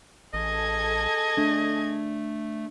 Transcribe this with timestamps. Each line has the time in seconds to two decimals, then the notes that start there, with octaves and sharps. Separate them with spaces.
0.34 A1 G#4 A4 D#5 G#6
1.37 A3 D4